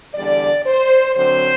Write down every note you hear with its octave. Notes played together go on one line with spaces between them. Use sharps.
E2 D3 G3 D5
C5
D3 F#3 C4 C5